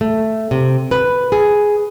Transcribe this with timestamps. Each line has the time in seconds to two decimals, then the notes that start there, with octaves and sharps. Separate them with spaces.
0.01 A3
0.51 C3
0.91 B4
1.32 G#4